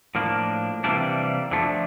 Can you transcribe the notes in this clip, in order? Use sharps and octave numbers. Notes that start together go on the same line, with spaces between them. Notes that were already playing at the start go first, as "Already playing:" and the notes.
A2 F3 A#3 D4
C3 E3 G3 A#3 D4
D3 F3 A3 D4